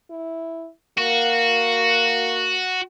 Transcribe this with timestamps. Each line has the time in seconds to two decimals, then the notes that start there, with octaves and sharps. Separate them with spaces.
0.10 E4
0.98 A#3 F#4